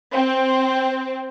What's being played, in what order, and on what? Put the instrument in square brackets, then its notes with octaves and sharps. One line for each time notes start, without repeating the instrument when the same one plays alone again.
[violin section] C4